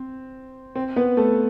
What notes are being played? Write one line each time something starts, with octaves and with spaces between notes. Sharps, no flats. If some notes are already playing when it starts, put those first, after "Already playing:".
Already playing: C4
C4
B3 B4
A3 A4